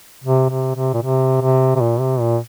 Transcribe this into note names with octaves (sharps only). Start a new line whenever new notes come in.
C3
C3
C3
A#2
C3
C3
C3
A#2
C3
A#2